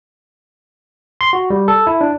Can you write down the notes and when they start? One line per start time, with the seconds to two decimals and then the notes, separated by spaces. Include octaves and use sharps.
1.21 C6
1.33 F#4
1.50 G3
1.68 A4
1.87 E4
2.01 D4